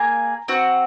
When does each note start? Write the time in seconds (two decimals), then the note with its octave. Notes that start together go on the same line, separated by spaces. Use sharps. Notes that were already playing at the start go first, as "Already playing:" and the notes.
Already playing: A#3 G#4 A#5
0.48 C4 F#4